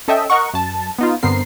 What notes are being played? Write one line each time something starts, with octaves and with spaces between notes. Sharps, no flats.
C#4 A4 D#5 E5 G5
A#4 D#5 F#5 C#6
F#2 A5
B3 D#4 F4
G2 D3 B3 C4 A#4 C7